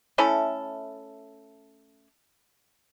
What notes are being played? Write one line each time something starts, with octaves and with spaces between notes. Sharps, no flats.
A3 C#4 E4 A4